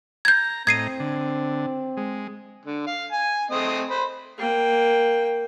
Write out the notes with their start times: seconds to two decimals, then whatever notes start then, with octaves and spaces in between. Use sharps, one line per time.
0.25 A#5 G6 G#6
0.67 A2 C4 D#5 A#5 G#6 C7 D#7
1.00 D3
1.97 G#3
2.66 D3
2.87 F5
3.12 G#5
3.51 A3 C4 D#5
3.90 C5 B5
4.38 A#3 G5